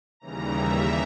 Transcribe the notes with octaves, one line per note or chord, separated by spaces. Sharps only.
D#2 C#3 E3 G3 A#5
E5